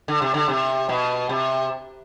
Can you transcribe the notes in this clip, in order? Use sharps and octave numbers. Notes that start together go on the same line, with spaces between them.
D3
C3
D3
C3
B2
C3